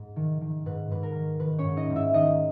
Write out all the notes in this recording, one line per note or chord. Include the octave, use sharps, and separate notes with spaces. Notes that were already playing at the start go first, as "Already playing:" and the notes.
Already playing: G#2
D#3
D#3
G#2 B4
G#2 B4
A#4
D#3
D#3 B4
C#4 C#5
G#2
D#4 D#5
G#2
E4 E5
D#3 D#4 D#5